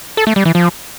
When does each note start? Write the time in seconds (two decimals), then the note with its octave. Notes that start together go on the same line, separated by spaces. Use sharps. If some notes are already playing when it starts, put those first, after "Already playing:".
0.17 A4
0.27 A3
0.36 G3
0.45 E3
0.55 F3